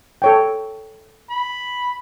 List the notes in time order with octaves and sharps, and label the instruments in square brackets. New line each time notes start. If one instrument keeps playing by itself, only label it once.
[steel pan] A4 C#5 G5
[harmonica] B5